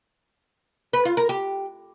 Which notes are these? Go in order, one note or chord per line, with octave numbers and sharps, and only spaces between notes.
B4
F4
A#4
G4